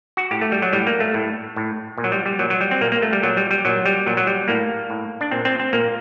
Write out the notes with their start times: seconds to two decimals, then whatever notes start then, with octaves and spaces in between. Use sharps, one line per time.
0.17 F#4
0.31 A2 G4
0.41 A3
0.52 G3
0.62 F#3
0.73 A2 G3
0.87 A#3
1.00 A3
1.14 A2
1.56 A2
1.98 A#2
2.04 F#3
2.12 G3
2.26 G3
2.39 A#2 F#3
2.50 F#3
2.61 G3
2.71 C4
2.81 A#2 A#3
2.92 A#3
3.02 A3
3.13 G3
3.23 A#2 F#3
3.37 G3
3.51 G3
3.65 A#2 F#3
3.86 G3
4.06 A#2 F#3
4.17 F#3
4.27 G3
4.48 A2 A#3
4.90 A2
5.21 D4
5.31 A#2 C4
5.45 C4
5.60 C4
5.73 A#2 A#3